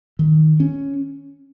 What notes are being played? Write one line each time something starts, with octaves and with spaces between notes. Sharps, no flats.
D#3
C#4